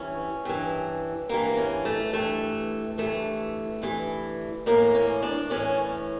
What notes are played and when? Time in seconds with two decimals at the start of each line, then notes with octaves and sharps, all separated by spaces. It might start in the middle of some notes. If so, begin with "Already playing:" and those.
Already playing: G2 E3 C#4
0.45 G2 E3
1.29 G2 E3 A#3
1.57 C#4
1.85 A3
2.13 G2 E3 A3
2.98 G2 E3 A3
3.82 G2 E3
4.66 A2 E3 A#3
4.95 C#4
5.22 D4
5.50 A2 E3 C#4